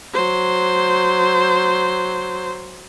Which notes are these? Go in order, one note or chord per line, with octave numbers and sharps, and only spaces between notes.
F#3 C5